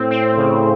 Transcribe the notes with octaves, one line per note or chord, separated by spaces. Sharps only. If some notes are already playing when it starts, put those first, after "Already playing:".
Already playing: A2 C4
C4
C#3